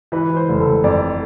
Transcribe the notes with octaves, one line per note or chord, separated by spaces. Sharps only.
E3 B4
E3
C5
F1
F1 A4
F2 D5